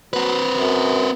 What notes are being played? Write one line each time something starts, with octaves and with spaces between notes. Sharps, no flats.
F#3 C4 B4
F#2